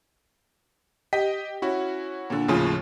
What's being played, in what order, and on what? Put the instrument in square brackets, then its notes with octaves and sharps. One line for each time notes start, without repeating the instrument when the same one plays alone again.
[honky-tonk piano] G4 [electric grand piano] D#5 B6
[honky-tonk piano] C#4 [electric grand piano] E4 F#4
[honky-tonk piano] A#2 D3
[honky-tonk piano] D#2 F4 G#5 [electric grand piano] A2 C#3 F3